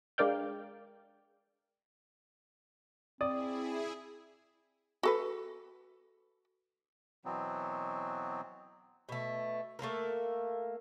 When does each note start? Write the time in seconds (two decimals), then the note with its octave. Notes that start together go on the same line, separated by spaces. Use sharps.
0.18 G#3 D4 A#4 D5 F5 G5
3.21 C4 E4 G#4 D5 D#6
5.03 F#4 A4 B4
7.25 B2 E3 F#3 B3 C4
9.09 B2 A3
9.79 A3 A#3 A4 A#4